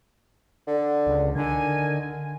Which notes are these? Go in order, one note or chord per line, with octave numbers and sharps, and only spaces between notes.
D3
C#2
D3 D#3 A#4 G#5